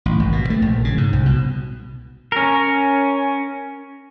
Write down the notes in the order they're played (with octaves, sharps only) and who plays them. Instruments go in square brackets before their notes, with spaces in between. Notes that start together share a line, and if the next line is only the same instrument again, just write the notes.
[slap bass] A1
G#1
B2
A3
A#1
C#3
G#2
C2
B2
[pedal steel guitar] C#4 A#4